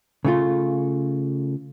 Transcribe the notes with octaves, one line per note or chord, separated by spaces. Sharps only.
C#3 A3 F4